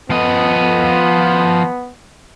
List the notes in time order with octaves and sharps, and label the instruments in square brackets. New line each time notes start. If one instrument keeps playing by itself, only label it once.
[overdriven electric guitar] F3 D#5 [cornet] B3